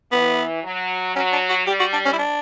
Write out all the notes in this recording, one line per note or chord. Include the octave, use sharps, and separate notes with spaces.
E3 B3
F#3
F#3 C#4
D4
F#4
G3 G4
F#4
D4
C#4
E4
D4